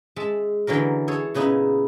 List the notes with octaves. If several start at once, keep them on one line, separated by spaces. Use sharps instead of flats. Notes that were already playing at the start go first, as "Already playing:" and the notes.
G#3 E5 A5
D3 E3 F#3 A#4
G#4 A4 C#5
A#2 C#3 B3 D#4 E4